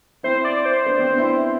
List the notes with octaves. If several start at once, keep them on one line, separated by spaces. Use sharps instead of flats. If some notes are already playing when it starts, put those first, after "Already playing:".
C4 E4 C5
D5
C5
B3 D4
C4
D4
C4 E4